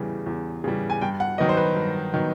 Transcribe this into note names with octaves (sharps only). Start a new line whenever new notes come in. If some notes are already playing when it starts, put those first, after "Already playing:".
Already playing: E2 C#3 E3 G3
E2
C#3 E3 G3
G#5
G2 G5
F#5
D#3 F#3 B3 D#5
C5
B4
G2
D#3 F#3 B3